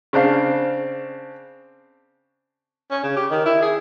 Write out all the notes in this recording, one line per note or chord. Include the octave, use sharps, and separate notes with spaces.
C#3 C4 D4 F5
C#4
C#3
G4
D#3
E4
G#4